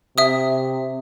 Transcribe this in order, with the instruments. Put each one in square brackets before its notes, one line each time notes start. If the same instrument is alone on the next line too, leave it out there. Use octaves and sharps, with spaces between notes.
[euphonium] C3 [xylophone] E5 D#6